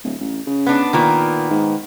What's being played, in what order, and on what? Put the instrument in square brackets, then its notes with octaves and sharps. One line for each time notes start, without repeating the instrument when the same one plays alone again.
[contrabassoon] D1
A1
C#3
[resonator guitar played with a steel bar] B3 D4
[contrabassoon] A#2 [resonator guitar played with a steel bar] D#3 A#3 B3
[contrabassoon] G#2